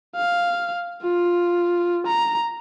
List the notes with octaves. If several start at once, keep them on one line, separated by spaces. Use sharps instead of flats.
F5
F4
A#5